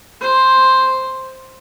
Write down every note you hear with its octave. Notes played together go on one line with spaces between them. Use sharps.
C5